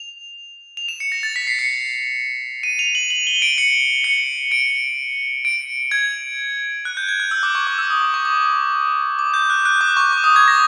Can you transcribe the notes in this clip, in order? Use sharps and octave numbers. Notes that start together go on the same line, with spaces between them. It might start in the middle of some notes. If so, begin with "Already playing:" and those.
Already playing: F7
F7
E7
C#7
A#6
A6
B6
C7
C#7
D#7
F7
F#7
F#7
G7
D7
C#7
C#7
D7
D7
G#6
F#6
G6
G#6
F#6
E6
D6
C#6
D6
E6
D#6
D6
C#6
D6
D6
G6
F#6
F#6
D6
C#6
D6
D#6
G#6
A#6